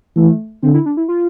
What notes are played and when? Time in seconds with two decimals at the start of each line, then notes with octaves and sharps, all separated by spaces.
0.16 E3 A3
0.63 D3 C4
0.74 E4
0.86 D4
0.97 E4
1.08 F4